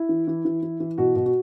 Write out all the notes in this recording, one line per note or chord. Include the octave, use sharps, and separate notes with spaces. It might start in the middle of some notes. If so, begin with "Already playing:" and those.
Already playing: E4
E3
E3
E3
E3
E3
B2 F#4
B2
F#4